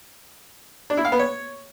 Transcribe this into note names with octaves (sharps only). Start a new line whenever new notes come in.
D4
E4
F5
B3
C#5